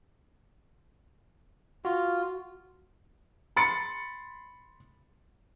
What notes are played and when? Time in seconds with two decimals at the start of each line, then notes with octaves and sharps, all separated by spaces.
1.85 F4 F#4
3.56 B5 C6 A6 C#7